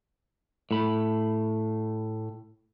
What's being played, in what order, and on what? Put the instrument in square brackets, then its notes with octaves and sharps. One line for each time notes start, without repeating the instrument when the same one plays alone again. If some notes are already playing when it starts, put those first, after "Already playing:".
[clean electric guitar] A2 B5